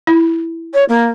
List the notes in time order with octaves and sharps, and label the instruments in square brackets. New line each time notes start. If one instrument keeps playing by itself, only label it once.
[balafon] E4
[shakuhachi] C#5
A#3